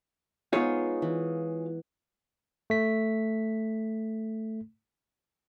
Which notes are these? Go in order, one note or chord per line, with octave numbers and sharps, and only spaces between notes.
G#3 B3 D#4 F4 G#4 C#5
E3
A3 B6